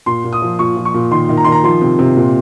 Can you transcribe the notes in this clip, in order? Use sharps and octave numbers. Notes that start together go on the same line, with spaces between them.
A#2 C6
A#2
D#6
F3
A#2 C#6
F3
C#6
A#2
D#3 C6
D#3
A#5
D#3 C6
A#5
F3 C6
C3
C3
A#2